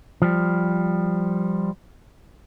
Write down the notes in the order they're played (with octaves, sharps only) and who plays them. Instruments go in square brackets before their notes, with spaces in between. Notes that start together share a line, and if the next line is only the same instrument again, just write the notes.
[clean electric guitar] F3 G3